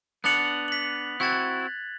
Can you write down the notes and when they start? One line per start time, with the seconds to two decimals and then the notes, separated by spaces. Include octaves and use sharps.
0.24 B3 D4 F#5 F#6 A6 F7
0.68 B6 F#7
1.20 C4 E4 F#4 F#6 G#6 A6